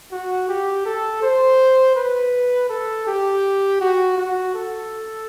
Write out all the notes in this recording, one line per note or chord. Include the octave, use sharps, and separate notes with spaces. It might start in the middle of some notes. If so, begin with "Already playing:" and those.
F#4
G4
A4
C5
B4
A4
G4
F#4
F#4
A4